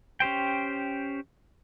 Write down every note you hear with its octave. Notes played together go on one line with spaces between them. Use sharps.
C#4 G4 C5 G5